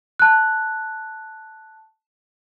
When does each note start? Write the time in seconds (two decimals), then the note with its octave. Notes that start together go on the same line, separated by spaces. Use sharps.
0.19 A5 F#6